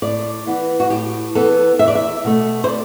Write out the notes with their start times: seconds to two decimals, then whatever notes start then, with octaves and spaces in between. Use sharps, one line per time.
0.02 A2 D5
0.47 E3 B3
0.80 F#4
0.90 A2 G4
1.35 E3 B3 A4
1.79 E2 E5
1.88 D5
1.95 E5
2.24 B2 A3
2.64 C5
2.68 D5